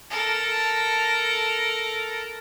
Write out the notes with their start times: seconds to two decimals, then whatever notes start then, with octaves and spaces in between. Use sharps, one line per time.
0.10 A4 A#4